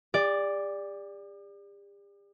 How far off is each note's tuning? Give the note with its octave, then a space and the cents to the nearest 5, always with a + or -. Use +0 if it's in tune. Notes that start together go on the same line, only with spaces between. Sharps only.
G4 +45 D5 +0